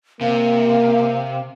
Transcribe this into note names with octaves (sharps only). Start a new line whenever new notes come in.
C3 A#3 F5